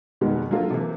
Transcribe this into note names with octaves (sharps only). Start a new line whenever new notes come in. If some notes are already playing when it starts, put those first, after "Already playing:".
F1 B2 D#3 G3 G#3 B3
D3 F#3 A#3 F4 A4
C3 E3 A#3